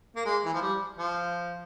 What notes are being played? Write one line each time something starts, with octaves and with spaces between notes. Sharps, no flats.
A#3
G#3
E3
F3
G3
F3